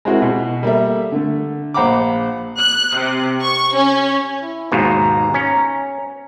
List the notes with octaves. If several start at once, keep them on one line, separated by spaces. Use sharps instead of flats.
G#3 C4 E4 F#4 G#4 A#4
B2
G3 A#3 A4 E5
D3 A3
A#1 C5 F#5 A#5 B5 D6
F#6
C3
C#6
C#4
E4
D#2 G#2 B2 A#5
C#4